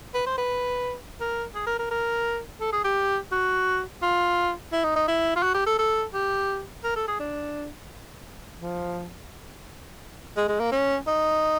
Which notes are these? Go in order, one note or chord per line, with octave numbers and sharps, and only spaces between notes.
B4
C5
B4
A#4
G#4
A#4
A#4
A#4
A4
G#4
G4
F#4
F4
E4
D#4
D#4
E4
F4
F#4
G4
A4
A4
G4
A#4
A4
G#4
D4
F3
G#3
G#3
A#3
C#4
D#4